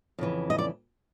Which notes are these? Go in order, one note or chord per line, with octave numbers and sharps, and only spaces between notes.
F2 C#3 E3
D#5
D5